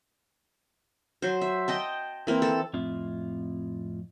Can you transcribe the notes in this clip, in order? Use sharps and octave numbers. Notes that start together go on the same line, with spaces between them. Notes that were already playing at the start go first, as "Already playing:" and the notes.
F#3 C5
E5
D#5 G5 A5
E3 A#3 C4
A4 A5
F2 A2 C4 F4 E5